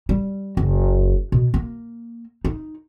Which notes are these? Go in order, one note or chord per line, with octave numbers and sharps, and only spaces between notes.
G3
F#1
B2
A#3
D#4